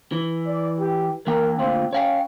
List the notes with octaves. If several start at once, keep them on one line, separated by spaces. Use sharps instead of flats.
E3
D5
G4
E3 A#3 A#4 G5
D2 A#2 C4 F4
C#4 C#5 F5 G5